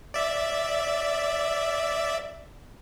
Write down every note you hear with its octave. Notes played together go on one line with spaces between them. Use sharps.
D5 E5